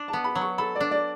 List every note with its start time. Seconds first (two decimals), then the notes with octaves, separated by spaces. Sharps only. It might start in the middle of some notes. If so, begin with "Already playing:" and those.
Already playing: D4
0.08 A5
0.13 B3
0.24 B5
0.35 F#3
0.41 C#6
0.58 A4 B5
0.75 D5
0.81 D4
0.91 D5